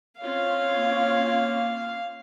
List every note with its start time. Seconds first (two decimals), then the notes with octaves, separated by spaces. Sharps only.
0.21 C4 C#4 F4 C#5 F5
0.76 A#3